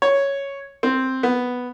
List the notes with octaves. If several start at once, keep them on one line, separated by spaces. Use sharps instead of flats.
C#5
C4
B3